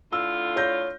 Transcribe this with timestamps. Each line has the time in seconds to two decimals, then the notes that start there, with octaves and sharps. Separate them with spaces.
0.13 A2 D3 F4 E6
0.56 C#5 G6 A#6